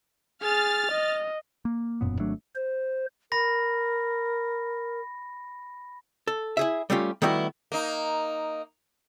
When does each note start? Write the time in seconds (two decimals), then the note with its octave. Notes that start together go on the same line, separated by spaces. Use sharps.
0.43 G#4 F6 A6
0.91 D#5
1.65 A#3
2.01 E1 F#2 A#2 B3
2.19 G#1 F#3 A3 D4
2.55 C5
3.32 A#4 B5 A#6
6.28 A4
6.57 E4 G#4 E5
6.90 G3 A3 C#4 F4 G4
7.22 D#3 G3 A3 B3 E4 F#4
7.72 A#3 D#4